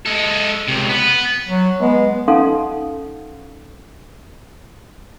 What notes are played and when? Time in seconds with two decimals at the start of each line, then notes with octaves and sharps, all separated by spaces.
0.06 G#3 A4
0.68 C#2 C3
0.89 B3
1.47 F#3
1.81 G#3 B3
2.28 C#4 D#4 A4 F5 F#5 C6